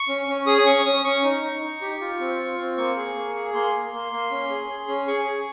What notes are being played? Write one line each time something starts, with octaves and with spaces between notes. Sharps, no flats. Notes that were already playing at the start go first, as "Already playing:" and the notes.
Already playing: C#6
C#4
C#4
G#4 D#6
D#6
C#4 C#6
C#4 D#6
C#4 C#6
D#4
D#4
D#4
G4
F4
C4
F4
C4
A#3 C#6
G#4
A#3
G#4
A#3 C6
A#3
A#3
A#3
C#4
G#4
G#4
C#4
G#4 C#6
G#4